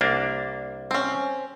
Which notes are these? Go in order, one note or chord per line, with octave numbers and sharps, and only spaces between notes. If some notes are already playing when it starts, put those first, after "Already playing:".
C2 A#3 D4
C4 C#4